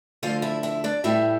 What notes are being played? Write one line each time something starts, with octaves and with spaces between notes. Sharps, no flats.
D2 D3 F3 F4 F5
E4 E5
E4 E5
D4 D5
A2 E3 G3 E4 E5